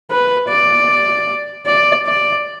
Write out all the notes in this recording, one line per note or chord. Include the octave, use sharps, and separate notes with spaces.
B4
D5
D5
D5